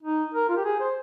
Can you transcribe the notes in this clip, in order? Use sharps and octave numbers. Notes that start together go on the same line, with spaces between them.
D#4
A#4
F4
G4
G#4
C5